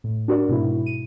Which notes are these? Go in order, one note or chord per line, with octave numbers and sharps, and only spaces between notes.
A2
D4 F#4 A#4 D5
G#2 B2 E4
D#7